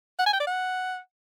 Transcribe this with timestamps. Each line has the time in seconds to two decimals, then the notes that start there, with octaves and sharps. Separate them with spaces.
0.19 F#5
0.26 G#5
0.33 G5
0.40 D5
0.47 F#5